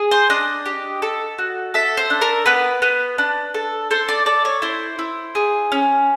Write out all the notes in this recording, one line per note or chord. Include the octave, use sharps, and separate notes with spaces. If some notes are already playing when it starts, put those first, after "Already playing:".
Already playing: G#4
C5
D4 D#5
G4
A4
F#4
A4 E5
C5
D4
A#4
B3 B4
B3
D4
A4
A4 C5
D5
A4 D5
C#5
E4 C5
E4
G#4
C#4